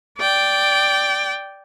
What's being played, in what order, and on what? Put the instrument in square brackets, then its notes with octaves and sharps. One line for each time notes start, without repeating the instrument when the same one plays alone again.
[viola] D5 G5